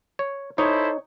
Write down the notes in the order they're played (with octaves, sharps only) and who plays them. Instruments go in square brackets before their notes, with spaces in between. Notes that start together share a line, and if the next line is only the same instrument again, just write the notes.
[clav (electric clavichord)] C#5
[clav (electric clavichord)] D#4 [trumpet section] E4 A4 C5 [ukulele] C#5 D#5